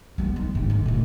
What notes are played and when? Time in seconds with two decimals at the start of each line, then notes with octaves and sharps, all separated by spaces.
0.18 G3 B3
0.36 D#3
0.55 G#2 G3
0.70 D3
0.86 A#2 A3